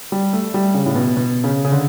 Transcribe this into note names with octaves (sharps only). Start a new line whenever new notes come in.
G3
A3
G3
C#3
A2
B2
B2
C#3
C#3
D3